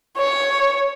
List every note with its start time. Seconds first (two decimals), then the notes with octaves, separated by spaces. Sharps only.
0.17 C#5